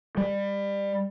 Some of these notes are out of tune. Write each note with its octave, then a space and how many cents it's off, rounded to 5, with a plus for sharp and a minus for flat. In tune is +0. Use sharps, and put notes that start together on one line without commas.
G3 +25